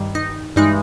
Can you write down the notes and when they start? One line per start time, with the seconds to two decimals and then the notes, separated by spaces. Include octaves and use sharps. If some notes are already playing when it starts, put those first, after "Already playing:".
Already playing: G2 D#3 G3
0.15 D#4
0.56 G2 E3 G#3 D#4